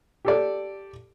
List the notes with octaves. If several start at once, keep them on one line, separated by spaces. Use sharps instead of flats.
G4 A4 D5